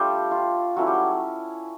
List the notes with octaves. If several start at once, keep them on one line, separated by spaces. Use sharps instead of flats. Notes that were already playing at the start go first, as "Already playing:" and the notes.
Already playing: G3 A3 D4 F4 G4
F4
F#3 A3 C#4 E4 F#4
G3 G4